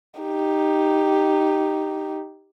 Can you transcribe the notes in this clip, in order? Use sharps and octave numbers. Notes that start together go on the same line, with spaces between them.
D#4 G4